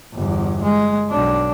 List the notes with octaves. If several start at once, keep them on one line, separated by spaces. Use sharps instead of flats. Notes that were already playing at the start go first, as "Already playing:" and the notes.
G1 E2
G#3
B1 D4